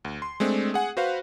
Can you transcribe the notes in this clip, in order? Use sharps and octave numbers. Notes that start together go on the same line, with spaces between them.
D2
C6
G#3 A3 C4 D4
G#4 F#5 G#5
F#4 B4 C5 F5